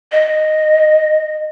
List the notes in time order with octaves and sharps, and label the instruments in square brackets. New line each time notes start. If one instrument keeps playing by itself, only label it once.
[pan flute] D#5